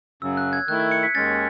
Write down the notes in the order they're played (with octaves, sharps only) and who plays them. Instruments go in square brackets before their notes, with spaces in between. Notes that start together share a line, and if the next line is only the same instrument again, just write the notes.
[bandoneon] F#2 C#3 F#3 [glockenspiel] E6
[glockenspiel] F#6
G#6
[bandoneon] D#3 A3 E4 [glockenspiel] F#6
[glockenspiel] G#6
C#7
B6
[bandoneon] D#2 D#3 G#3 C#4 [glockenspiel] A6